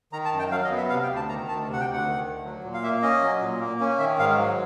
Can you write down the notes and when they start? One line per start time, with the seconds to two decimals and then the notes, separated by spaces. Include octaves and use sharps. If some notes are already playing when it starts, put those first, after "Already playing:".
0.12 D#3 A#5
0.25 A5
0.32 F#2
0.39 G5
0.51 F#3 F5
0.64 D#5
0.71 B3
0.77 E5
0.90 C3 F5
1.03 G5
1.09 D2
1.16 A5
1.29 D#3 A#5
1.48 D2 A5
1.67 C3
1.73 F#5
1.81 G5
1.87 D2
1.93 F#5
2.06 D#3
2.26 D2
2.45 F#3
2.64 A#2
2.74 F5
2.83 A#3 E5
3.02 C#4 D#5
3.22 F#3
3.42 A#2
3.60 A#3
3.80 C#4
3.99 D#3 E5
4.19 G#2 F5
4.38 F#3